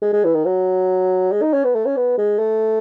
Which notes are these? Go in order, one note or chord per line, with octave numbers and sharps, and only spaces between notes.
G#3
G#3
E3
D#3
F#3
G#3
D#4
C#4
B3
A3
C#4
B3
G#3
A3